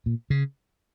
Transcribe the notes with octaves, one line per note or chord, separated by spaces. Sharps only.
A#2
C#3